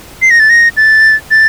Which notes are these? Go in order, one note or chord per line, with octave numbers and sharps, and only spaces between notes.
C7
A#6
A6
A#6
A6
A6